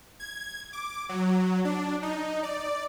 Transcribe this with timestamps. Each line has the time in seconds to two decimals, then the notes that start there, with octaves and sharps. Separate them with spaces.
0.20 G#6
0.73 D6
1.09 F#3
1.65 D4
2.03 D#4
2.43 D5